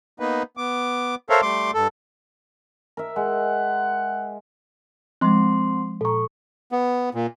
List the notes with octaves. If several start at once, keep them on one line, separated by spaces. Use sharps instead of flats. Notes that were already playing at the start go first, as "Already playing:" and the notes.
A#3 B3 D#4 B4
B3 D6
A4 A#4 C5 C#5 E5 F5
G3 A3 C6 D6
G2 A4
A#4 E5
G#3 F#5
F3 G#3 C4 C6
A#2 A4 A#5 C#6
B3
A#2